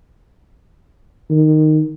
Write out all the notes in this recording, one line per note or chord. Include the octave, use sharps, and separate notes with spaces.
D#3